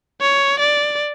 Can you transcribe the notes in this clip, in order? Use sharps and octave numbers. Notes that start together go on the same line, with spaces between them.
C#5
D5